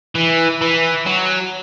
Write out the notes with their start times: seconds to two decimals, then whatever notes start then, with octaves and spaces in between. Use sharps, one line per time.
0.15 E3
0.61 E3
1.06 F#3